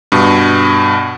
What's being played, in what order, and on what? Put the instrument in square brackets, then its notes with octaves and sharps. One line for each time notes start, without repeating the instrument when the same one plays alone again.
[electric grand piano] G2 B2